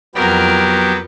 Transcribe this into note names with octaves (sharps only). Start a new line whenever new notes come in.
F2 F#3 B3 G4 A#4